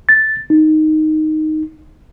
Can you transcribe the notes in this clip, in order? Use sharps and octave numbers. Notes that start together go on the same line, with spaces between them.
A6
D#4